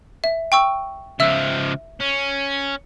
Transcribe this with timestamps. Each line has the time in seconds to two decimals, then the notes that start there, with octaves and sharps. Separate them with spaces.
0.24 E5
0.52 G5 C#6 E6
1.20 C#2 F3 E5 E6
2.01 C#4